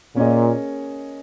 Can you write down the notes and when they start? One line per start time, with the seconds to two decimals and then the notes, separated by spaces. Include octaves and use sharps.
0.16 A#2 A#3 C#4 G#4 D#5